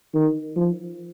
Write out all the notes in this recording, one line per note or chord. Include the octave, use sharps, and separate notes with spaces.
D#3
F3